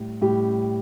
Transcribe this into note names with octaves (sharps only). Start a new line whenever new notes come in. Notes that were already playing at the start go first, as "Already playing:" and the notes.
Already playing: A2 G3
A2 G3 G4